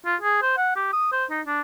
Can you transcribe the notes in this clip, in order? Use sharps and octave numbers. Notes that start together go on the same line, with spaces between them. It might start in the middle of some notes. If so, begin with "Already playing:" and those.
F4
G#4
C5
F#5
G4
D#6
C5
D#4
D4